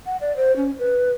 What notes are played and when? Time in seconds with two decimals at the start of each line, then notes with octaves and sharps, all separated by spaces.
0.06 F#5
0.21 D5
0.37 C5
0.56 C#4
0.79 B4